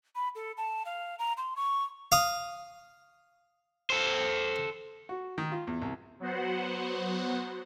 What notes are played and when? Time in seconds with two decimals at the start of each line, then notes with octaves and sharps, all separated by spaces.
0.15 B5
0.35 A4
0.57 A5
0.85 F5
1.19 A#5
1.37 C6
1.56 C#6
2.12 F5 D#6
3.90 A4 C5
5.09 F#4
5.38 D#3
5.52 F4
5.67 E2
5.82 C2
6.20 F#3 B3 F#4 C5 F#5